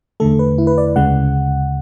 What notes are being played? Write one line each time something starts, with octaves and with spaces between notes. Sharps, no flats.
E2 D3 A3 A4
B4
E4
B4
D5
D2 C#3 G#3 F#5